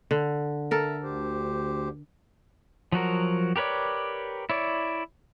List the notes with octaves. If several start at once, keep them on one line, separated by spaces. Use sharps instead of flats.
D3
A4 A#4 E5
D2 G4 C5
F3 F#3 F#4 A#4
G4 A#4 B4 C#5 D5
E4 C#5 D5